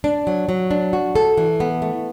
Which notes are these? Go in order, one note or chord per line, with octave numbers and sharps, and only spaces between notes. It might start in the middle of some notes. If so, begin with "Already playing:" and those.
D4
F#3
F#3
D4
F#4
A4
E3
B3
A3